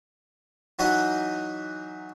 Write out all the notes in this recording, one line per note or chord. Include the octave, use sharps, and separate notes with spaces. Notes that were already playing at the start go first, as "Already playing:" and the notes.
E3 F#3 D#4 F#4 D#5